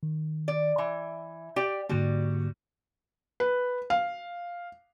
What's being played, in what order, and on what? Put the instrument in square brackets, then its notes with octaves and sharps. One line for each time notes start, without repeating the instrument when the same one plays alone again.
[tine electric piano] D#3
[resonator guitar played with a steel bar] D5
[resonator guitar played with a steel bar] E3 [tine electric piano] E5
[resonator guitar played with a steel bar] G4 D5 G5
[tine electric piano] G#2 D3 A#3 [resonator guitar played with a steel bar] G3 F#4
[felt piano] B4
F5